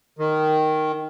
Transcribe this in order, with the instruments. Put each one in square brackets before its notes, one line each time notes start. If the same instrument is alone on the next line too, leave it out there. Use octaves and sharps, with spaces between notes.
[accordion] D#3